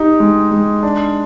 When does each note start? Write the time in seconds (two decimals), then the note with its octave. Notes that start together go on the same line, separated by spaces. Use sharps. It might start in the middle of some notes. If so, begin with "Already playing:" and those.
Already playing: D#4 G4
0.20 G#3
0.51 G#3
0.83 D4